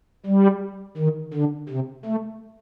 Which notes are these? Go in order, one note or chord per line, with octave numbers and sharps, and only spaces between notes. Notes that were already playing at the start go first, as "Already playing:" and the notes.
G3
D#3
D3
C3
A3